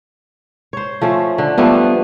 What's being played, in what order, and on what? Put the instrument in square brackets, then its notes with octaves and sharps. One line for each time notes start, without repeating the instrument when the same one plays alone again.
[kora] C5 C#5
F3 A3 C#4
D3
[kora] F3 G3 A3 [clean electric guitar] B3